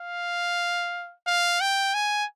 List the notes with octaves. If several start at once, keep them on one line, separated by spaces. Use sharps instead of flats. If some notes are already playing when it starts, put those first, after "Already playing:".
Already playing: F5
F5
G5
G#5